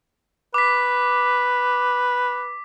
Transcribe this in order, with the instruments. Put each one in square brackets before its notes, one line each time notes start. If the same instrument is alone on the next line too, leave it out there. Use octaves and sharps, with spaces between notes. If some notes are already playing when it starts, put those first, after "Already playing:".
[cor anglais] B4 [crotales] D6 B6